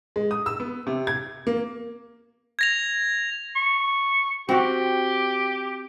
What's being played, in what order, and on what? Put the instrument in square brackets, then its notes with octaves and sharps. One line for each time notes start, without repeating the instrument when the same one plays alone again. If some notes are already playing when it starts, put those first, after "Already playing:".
[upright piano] G#3
D#6
E6
B3
C3
G#6
A#3
[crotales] G#6 A#6 F7
[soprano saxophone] C#6
[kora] C4 F#4 [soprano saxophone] G4